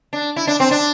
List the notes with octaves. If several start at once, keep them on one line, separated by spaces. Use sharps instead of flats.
D4
E4
D4
C4
D4